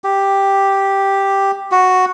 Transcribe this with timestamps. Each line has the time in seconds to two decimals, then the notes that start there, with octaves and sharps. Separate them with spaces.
0.04 G4
1.72 F#4